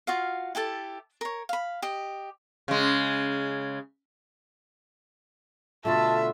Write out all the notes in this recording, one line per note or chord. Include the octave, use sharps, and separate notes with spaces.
F4 F#4 F5
E4 G4 A4 A5
A#4 C#5
F5 B5
G4 D#5
C#3 G#3
B2 D3 A3 F4 E5 A5